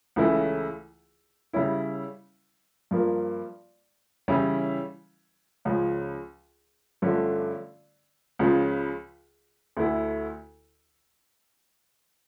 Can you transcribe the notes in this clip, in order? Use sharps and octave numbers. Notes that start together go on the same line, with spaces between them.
C#2 C#3 E3 A3 E4
C#3 G3 C#4 E4
G2 F3 A#3
C#3 E3 G3 C#4 E4
C#2 C#3 F3
G2 D3 F3 A3 C#4
C#2 C#3 F3
D2 D3 A3 E4